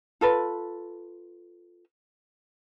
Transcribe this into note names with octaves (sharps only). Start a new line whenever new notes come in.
F4 A4 B4